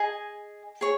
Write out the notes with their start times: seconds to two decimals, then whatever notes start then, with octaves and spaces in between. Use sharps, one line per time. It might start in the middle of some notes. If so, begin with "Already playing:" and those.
Already playing: G#4 D#5 G#5
0.81 G#4 C#5